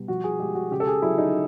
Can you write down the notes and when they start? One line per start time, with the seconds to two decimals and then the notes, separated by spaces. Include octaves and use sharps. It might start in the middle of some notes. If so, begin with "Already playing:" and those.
Already playing: B2 G3
0.08 F3 F#4
0.24 G#4
0.39 G#3 G4
0.55 F#4
0.71 C#3 G4
0.80 A4
0.87 G#4
1.02 F#3 E4
1.18 D#4